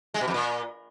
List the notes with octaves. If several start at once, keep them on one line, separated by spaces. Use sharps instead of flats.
G#3
B2
F2
A#2